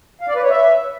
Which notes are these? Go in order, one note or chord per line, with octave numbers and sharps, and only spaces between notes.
F5
D5
B4
C#5
E5